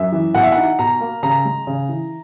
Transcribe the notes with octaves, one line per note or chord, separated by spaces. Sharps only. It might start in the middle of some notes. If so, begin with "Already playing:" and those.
Already playing: F#2 E5
E3
B2 F#5
E5
D#4 F#5
B2 A#5
A#3
C#3 A#5
G#3
C#3
E3